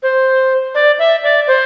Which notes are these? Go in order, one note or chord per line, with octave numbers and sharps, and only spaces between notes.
C5
D5
E5
D5
C5